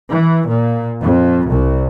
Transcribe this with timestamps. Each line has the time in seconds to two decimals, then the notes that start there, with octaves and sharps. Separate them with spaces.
0.10 E3
0.47 A#2
1.01 F2
1.47 C2